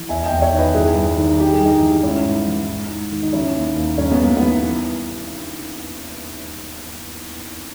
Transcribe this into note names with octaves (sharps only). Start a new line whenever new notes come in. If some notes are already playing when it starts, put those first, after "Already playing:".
Already playing: E3
E2 E5 G#5
D#5 G5
E2
C#5 E5
D#3
B4 D#5
G2 E4 G#4
G2
D#3
G2 G4
G#4
G2 D#4 G4
E3
G#2 C#4 E4
G#2
E3
G#2
G#2
D#3
D#4
E3 C#4 E4
D#2
D#2
G2 C#4
B3
G2 A#3
E3 B3
E3